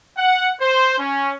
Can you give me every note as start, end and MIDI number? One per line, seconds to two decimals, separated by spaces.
0.17 0.51 78
0.61 0.96 72
0.99 1.32 61